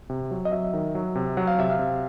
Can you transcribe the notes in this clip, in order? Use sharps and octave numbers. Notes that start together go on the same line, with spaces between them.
C3
F#3
D#5
F#3 E5
D#3
F#3
C3
F#3 F#5
F5
C3 E5
F5
C3